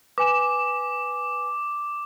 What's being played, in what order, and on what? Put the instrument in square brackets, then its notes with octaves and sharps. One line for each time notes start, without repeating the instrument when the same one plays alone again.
[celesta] B4 G#5 E7 [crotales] D6